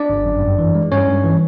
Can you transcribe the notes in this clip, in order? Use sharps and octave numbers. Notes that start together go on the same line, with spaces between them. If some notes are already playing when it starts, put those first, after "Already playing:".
Already playing: D4 D5
G1
F#2
G2
E3
G#3
G2 C#4 C#5
G2
E3